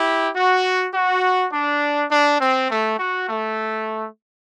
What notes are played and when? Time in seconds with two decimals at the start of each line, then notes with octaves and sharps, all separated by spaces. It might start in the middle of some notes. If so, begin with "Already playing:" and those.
Already playing: E4 G4
0.35 F#4
0.94 F#4
1.53 D4
2.11 D4
2.41 C4
2.71 A3
2.99 F#4
3.29 A3